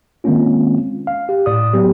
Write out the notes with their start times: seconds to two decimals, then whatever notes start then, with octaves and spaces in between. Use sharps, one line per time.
0.24 D#3 G#3 A#3 C4 C#4 F4
1.07 F5
1.29 G4
1.46 A2 D5 D#6
1.73 F#3 B3 G4